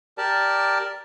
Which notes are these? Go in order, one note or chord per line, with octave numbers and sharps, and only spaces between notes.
G4 A#4 D5 A5